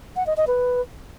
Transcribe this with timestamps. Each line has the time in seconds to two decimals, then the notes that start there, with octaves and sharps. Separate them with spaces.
0.16 F#5
0.27 D#5
0.37 D#5
0.47 B4